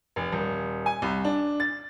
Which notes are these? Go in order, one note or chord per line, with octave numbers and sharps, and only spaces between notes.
F1
D#1
G#5
C2
D4
A6